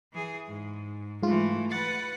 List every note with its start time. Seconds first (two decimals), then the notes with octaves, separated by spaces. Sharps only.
0.13 E3 G#4
0.48 G#2
1.23 G#2 E3 A3 F4
1.72 B4 F#5 A6